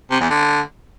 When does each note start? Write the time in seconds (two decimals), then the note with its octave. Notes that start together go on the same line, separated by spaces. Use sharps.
0.11 C3
0.21 E2
0.30 D3